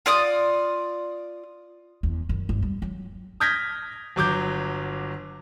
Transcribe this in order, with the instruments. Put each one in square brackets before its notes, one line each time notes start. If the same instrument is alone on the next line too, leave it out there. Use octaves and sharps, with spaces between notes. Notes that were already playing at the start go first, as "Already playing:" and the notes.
[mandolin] F4 D5 D#6
[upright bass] E2
F#2
G1
G3
F#3
[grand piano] D#6 F6 G6 G#6 A#6 B6
G1 F#3 D6 G6